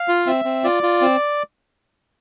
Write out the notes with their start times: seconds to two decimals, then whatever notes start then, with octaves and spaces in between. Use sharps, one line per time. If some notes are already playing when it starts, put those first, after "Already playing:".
Already playing: F5
0.08 F4
0.26 C4 E5
0.45 C4
0.64 F4 D5
0.83 F4
1.01 C4